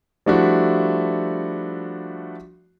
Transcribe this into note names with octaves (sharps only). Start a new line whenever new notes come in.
F3 G3 A3 D4 E4 F#4